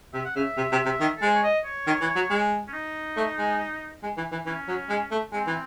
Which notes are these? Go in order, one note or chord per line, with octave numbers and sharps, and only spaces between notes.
C3 E5
F#5
C#3 E5
C3
C3
C3
D#3
A4
G#3 C5
C#5
D#5
C#5
D#3
E3
F#3
G#3
C#4
D#4
A3
G#3
G#3
E3
E3
E3 C#4
F#3
G#3
A3
G#3 C4
E3